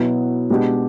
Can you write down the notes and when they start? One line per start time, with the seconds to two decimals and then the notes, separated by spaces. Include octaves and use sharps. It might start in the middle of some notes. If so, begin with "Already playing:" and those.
Already playing: B2 F#3 B3 E4
0.50 B2 G#3 B3 D4 G4